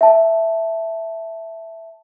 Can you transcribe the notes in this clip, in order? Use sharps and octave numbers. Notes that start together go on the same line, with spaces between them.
E5 A5